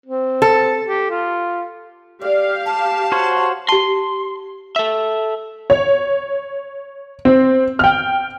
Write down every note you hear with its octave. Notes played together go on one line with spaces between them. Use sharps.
C4
A4
G4
F4
G4 D5 F5
F3 G#4 A5
F#4 C5 C#5
G4 A5 C6
A4 E5
C#5
C4
G5 F6